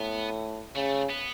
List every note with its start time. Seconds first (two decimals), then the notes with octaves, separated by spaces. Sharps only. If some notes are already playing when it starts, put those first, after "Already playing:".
Already playing: A2 B3
0.75 C#3 A3
1.09 B3